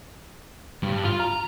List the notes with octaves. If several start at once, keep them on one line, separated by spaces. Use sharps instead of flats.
G2
F4
A#5